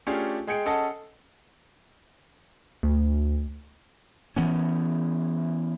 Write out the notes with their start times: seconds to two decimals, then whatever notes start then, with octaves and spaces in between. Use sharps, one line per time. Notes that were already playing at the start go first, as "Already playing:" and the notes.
0.07 A3 C#4 D4 F4 G4 G#4
0.47 G#3 G#4 G5 C#7 D7
0.66 C#4 G#4 A4 D#5 F#5 A5
2.83 D2
4.36 E3 B3 C#4